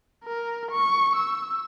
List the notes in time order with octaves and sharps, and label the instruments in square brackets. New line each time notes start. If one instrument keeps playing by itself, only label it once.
[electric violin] A#4
C#6
E6